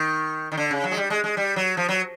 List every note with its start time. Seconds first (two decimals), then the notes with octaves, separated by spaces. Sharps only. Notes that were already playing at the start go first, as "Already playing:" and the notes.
Already playing: D#3
0.52 D#3
0.57 D3
0.71 C#3
0.84 F#3
0.91 G#3
0.97 G3
1.10 G#3
1.24 G#3
1.37 G3
1.56 F#3
1.77 F3
1.89 F#3